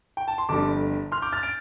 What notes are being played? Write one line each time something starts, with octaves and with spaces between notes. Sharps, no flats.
G5
A5
C6
G1 F2 D3 G3 A5 D6
C6 F6
D6 G6
F6 A6
A6 D7